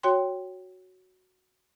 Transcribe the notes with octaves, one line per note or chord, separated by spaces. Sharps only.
F#4 C#5 G5 C6